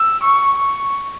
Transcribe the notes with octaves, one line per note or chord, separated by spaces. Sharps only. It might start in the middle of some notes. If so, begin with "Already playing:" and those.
Already playing: E6
C#6
C#6